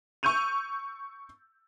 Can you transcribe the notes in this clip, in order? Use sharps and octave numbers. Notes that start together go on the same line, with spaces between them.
C#6 E6 G6 D#7 F7